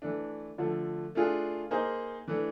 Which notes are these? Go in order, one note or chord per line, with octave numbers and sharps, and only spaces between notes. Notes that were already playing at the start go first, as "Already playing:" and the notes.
E3 A3 D4
D3 F3 A3
A3 D4 F4 G#4
A#3 D#4 G#4 C5
E3 A3 D4